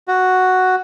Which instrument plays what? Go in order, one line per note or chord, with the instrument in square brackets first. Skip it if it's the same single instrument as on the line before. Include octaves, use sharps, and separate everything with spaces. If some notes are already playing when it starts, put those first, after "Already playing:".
[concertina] F#4